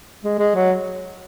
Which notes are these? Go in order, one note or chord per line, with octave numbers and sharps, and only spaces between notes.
G#3
G#3
F#3